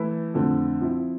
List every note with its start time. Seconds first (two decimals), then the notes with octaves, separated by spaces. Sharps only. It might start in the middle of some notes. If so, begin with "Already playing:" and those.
Already playing: E3 A3 E4 B4
0.34 F2 D3 A3 C4
0.81 F3 C4 E4